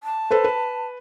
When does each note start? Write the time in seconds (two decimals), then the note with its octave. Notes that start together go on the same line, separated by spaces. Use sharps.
0.03 A5
0.31 A4 B4 C5
0.44 B4